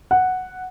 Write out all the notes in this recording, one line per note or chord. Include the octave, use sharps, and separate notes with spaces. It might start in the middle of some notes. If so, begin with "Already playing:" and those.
F#5